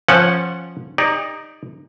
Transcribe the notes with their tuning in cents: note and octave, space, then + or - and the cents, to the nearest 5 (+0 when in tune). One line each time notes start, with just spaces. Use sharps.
F3 +0 C#4 -15 F#5 +0
D#4 +0 G4 +40 D5 +0